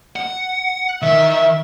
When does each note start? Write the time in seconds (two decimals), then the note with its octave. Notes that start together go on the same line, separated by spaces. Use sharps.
0.16 F#5
1.02 D#3 E5